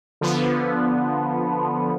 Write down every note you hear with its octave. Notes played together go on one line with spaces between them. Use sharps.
D3 F3 B3